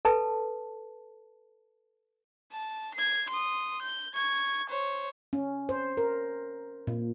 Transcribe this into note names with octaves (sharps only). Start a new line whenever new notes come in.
A4 B4 A5
A5
G#6 C7
C6 D#6
G6
C#6 G#6
C5 C#5
C#4
C5
A#4
A#2